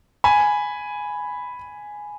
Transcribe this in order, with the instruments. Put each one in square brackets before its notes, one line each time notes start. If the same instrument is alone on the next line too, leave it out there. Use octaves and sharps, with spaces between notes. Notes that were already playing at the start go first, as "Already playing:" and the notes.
[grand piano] G#5 B5